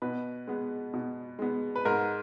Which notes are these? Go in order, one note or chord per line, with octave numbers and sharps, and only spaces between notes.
B2 B4
G#3 B3
B2
G#3 B3
B4
G#2 A#4